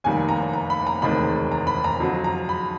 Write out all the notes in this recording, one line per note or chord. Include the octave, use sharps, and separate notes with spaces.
F1 D#2 D#3 G3 G#5
A#5
A#5
B5
A#5
E1 D2 C3 D#3 G#3 B5
A#5
B5
A#5
F2 D3 F#3
A#5
B5